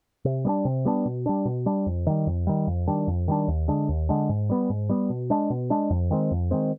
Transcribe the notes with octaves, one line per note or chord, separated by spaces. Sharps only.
C3
G3 B3 D4
C3
G3 B3 D4
B2
G3 D4
B2
G3 D4
F2
D#3 G3
F2
D#3 G3
F2
D#3 G3 D4
F2
D#3 G3 D4
D#2
D3 G#3 D4
D#2
D3 G#3 D4
G#2
G3 B3
G#2
G3 B3
B2
G#3 D4
B2
G#3 D4
F2
D#3 G#3 C4
F2
D#3 G#3 C4